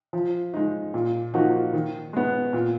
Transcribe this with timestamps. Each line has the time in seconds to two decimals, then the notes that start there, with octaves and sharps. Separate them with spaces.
0.13 F3
0.54 G#3 D#4
0.94 A#2
1.34 F3 A#3 D#4 F#4
1.73 D#3
2.13 G#3 B3
2.53 A#2